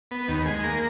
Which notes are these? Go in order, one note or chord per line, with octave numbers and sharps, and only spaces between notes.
B3
D#2
G#3
A#3